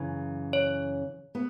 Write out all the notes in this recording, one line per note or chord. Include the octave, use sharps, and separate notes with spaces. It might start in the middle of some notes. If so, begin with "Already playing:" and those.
Already playing: F#2 C#3 E3
C#5
B3